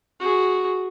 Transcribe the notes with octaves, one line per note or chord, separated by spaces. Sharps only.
F#4 G#4